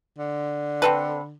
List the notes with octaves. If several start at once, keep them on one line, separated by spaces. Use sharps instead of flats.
D3
C4 A4 B4